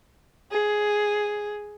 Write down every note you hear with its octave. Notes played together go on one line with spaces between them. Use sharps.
G#4